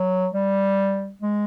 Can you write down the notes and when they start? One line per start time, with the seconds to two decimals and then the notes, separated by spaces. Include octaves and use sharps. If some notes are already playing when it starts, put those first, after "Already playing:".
Already playing: F#3
0.34 G3
1.22 G#3